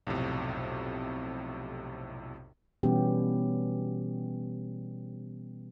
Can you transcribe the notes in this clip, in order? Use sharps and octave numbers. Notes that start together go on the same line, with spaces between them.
B1 F2 A2 C3
B2 E3 G3 B3 C#4 G4